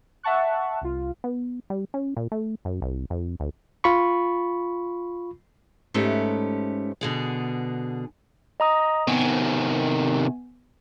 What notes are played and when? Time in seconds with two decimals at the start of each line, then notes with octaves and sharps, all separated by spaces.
0.23 E5 F#5 A5 C#6 F#6
0.81 C2 F4
1.24 B3
1.70 G3
1.94 C#4
2.17 A#2
2.32 A3
2.65 F#2
2.82 C2
3.10 F2
3.40 D2
3.84 F4 B5 C#6
5.94 G#2 A3 C#4 G4 B4
7.01 B2 D3 G#4
8.60 D#5 A#5 D#6
9.07 C3 D#3 B3 G#5